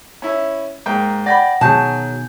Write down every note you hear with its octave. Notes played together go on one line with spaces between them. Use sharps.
C#4 E4
G#2 A#3 G5
D5 F#5 G5 B5 A#6
B2 D#3 F#3 F#4 G#4 G#5 A5 G6